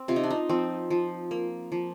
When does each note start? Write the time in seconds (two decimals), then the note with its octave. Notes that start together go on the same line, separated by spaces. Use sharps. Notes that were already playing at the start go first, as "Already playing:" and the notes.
Already playing: C4
0.08 C3 F4
0.16 D#4
0.23 D4
0.30 D#4
0.49 F3 C4
0.90 F3
1.31 A#3
1.72 F3